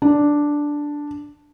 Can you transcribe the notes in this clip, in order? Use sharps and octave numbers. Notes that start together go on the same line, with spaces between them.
D4